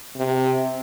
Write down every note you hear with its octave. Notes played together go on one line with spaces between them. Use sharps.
C3